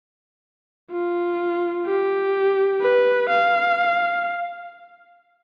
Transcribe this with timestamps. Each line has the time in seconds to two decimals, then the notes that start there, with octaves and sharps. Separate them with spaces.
0.91 F4
1.86 G4
2.81 B4
3.29 F5